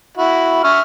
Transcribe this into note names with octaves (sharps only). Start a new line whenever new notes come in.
E4 F#4
E5 C#6 F6